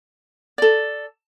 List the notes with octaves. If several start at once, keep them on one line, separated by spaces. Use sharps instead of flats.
A4 D5